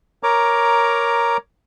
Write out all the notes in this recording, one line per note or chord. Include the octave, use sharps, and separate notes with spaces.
A#4 C#5 A#5 D6